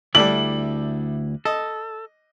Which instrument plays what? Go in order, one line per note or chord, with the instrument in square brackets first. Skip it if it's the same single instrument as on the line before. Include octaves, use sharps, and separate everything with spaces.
[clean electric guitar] D2 E4 D5 [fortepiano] G3 A3 D4 [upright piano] F#7
[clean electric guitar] A4 [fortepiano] D#5